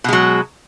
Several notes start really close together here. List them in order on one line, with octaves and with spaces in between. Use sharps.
B2 G#3 F#3